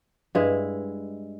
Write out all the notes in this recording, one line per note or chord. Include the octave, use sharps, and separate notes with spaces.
G2 G#3 E4